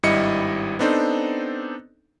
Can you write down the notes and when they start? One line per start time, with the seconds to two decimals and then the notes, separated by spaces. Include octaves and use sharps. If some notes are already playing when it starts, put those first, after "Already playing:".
0.03 G#1 G2 G3 E4 D#5 C#7
0.79 B3 C4 D4 D#4 A4 C5